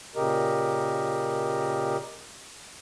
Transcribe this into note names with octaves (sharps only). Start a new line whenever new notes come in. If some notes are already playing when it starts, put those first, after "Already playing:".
A#2 C#3 G4 A#4 D#5